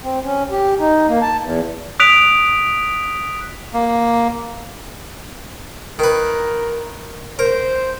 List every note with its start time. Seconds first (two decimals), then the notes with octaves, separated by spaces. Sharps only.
0.03 C4
0.24 C#4
0.51 G4
0.79 D#4
1.08 A#3
1.22 A5
1.41 E2
2.00 D#6 F#6 B6 D7 F7
3.73 A#3
5.99 D#3 A#4 B4
7.39 A#4 C5